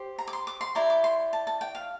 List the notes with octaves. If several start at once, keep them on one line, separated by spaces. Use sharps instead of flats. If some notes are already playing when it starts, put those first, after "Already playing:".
Already playing: G4 C5
A#5
D6
C6
D6
C6
E4 G4 D5 A#5
D6
C6
A5
A5
G5
F5